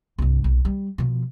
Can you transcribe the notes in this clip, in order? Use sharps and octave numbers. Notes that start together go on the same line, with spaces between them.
C2 G2
B1
G3
B2 F3